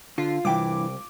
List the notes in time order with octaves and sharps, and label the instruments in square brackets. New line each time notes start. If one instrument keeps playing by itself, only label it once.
[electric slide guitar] D3 [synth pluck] F4
[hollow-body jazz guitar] C2 G5 [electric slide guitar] G2 E3 [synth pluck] D6